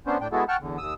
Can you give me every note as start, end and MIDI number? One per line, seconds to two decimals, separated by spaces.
0.07 0.18 59
0.07 0.18 61
0.07 0.18 62
0.07 0.18 72
0.21 0.28 45
0.21 0.28 62
0.21 0.28 79
0.32 0.44 56
0.32 0.44 59
0.32 0.44 64
0.32 0.44 66
0.32 0.44 68
0.32 0.44 69
0.48 0.57 78
0.48 0.57 79
0.48 0.57 81
0.48 0.57 85
0.48 0.57 89
0.61 0.78 40
0.61 0.78 50
0.78 0.94 39
0.78 0.94 87
0.78 0.94 88